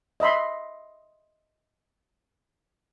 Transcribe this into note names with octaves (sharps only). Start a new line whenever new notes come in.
D#5 E5 B5 C6